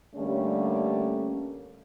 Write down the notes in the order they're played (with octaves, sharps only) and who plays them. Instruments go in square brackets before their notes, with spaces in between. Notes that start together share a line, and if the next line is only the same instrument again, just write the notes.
[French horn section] D3 G3 A3 A#3 C#4